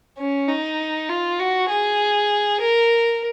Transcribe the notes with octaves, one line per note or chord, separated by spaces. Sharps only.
C#4
D#4
F4
F#4
G#4
A#4